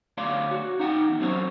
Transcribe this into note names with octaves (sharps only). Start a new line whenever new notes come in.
D2 C#5 D5 F5 C6
F#4
D#4 F#5 G5
E2
F#3 C4 C#4 A#4 C5 C#5